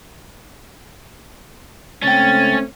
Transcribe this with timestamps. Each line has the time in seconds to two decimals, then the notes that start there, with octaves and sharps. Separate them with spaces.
2.03 C#2 A3 C4 C#4 G5 A6